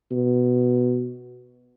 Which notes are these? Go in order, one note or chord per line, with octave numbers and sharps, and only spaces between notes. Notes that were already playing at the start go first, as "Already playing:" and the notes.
B2